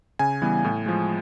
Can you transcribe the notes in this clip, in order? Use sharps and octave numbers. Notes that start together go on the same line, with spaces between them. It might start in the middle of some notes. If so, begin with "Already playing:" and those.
C#3 G#5
E3 G3 B3
A2
F3 G#3